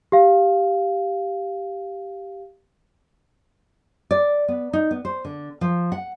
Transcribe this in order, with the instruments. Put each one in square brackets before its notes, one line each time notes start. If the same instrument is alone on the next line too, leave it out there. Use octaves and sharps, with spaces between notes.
[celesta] G4 F5
[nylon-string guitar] D5
B3
D#4
B3
C5
D3
F3
F#5